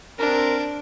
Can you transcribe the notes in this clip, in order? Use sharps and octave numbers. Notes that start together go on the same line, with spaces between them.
C4 D4 A#4